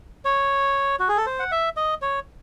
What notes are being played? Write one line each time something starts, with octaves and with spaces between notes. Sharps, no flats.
C#5
F#4
G#4
A4
C5
F#5
E5
D#5
C#5